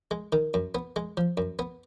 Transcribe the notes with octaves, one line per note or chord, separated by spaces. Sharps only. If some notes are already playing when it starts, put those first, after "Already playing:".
G#3
D#3
F#2
B3
G#3
F3
F#2
B3